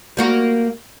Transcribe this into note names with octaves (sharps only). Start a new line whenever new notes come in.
G3 A#3 F#4